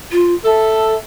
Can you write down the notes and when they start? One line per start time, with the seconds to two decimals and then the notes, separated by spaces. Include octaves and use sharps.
0.12 F4
0.44 A4 E5